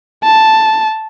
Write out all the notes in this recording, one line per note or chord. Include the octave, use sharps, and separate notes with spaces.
A5